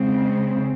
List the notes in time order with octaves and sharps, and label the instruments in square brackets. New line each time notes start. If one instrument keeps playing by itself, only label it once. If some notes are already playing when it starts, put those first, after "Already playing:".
Already playing: [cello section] C#3 G#3 C4